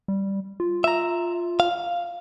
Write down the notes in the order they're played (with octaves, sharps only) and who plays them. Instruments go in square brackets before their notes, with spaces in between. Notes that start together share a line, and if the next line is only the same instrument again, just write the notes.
[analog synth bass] G3
F4
[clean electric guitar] E5 A#5
F5